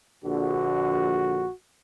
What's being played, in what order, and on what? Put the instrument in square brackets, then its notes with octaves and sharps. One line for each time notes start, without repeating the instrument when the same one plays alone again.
[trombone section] A#1 D3 [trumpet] F#4